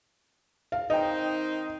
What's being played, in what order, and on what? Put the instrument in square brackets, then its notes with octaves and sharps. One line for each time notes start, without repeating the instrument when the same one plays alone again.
[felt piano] F5
[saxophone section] D#3 C4 D#4 [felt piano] D#5 G5